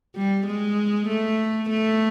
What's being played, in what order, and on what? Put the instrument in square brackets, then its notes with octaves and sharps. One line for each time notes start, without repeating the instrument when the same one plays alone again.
[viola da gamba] G3
G#3
A3
A3